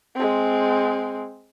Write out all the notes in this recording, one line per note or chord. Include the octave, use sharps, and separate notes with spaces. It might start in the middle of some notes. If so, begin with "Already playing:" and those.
G#3 C4